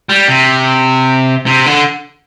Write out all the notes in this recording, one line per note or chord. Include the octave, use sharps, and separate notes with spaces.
G3
C3
C3
D3